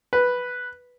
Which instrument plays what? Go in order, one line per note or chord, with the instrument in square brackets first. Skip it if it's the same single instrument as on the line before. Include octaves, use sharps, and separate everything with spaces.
[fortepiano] B4